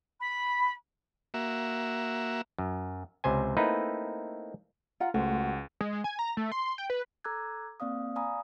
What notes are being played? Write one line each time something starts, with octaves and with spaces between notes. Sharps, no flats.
B5
A#3 F#4 E5
F#2
C#2 C3 C5 G#5
A3 A#3 C4 D#4 E4 B4
F4 F#5 A#5
C#2 A3 F#4 C5
G#3
G#3
G#5
A#5
A3
C6
G5
B4
A4 A#5 D6 E6 F#6 G#6
A#3 C4 D5 F5 D#6
D5 F5 G#5 A#5 B5 D#6